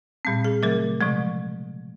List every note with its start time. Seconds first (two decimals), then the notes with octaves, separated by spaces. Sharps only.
0.25 A#2 G3 C4
0.44 G#4
0.63 C#3 F#3 A3 A#4
1.01 C3 F3 G#3